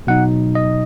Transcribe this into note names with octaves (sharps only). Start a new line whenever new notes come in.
B2 F#3 D#4 F#5
D#5